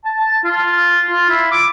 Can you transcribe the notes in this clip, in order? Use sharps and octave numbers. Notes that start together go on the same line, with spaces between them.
A5
A5
F4
F4
E4
D6